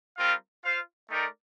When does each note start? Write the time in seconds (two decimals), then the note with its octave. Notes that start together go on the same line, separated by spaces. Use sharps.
0.17 G3 C4 F4 A#4 F5
0.63 F4 C5 F5
1.09 A3 D#4 A#4 D5 G5